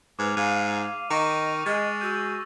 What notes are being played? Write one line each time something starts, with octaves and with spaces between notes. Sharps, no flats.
G#2 B4 D6 F6 F7
G#2 F5 D#7
D#3 D#5 C#6 A#6 F7
G#3 D#5 A6
F#4 E6 G6